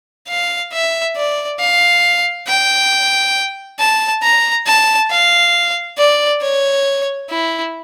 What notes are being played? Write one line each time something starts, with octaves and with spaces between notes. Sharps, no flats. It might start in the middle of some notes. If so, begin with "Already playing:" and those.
F5
E5
D5
F5
G5
A5
A#5
A5
F5
D5
C#5
E4